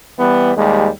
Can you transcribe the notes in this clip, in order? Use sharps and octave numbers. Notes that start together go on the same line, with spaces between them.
E3 G3 B3
D#2 G3 G#3